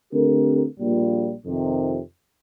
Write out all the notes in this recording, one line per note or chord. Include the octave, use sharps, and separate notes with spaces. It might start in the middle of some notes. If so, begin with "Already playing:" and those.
D3 A3 C4 G4 A#4
A#1 A#2 G3 A#3 F4
F2 C3 D#3